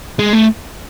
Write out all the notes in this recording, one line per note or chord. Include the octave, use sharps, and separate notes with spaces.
G#3
A3